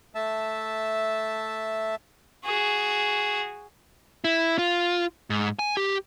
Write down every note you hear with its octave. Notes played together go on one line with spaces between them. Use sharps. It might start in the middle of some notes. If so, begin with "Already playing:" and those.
A3 E5 A5
F#4 G#4
E4
F4
G#2
G#5
G4